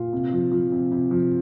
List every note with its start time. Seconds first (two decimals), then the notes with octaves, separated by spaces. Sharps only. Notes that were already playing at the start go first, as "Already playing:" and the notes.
Already playing: A#2 F4
0.13 C3
0.32 F3
0.52 F3
0.72 C3
0.91 C3
1.11 F3